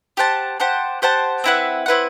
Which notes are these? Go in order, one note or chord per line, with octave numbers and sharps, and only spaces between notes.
G4 C5 F#5 A5
G4 C5 F#5 A5
G4 C5 F#5 A5
C4 E4 B4 F#5
C4 E4 B4 F#5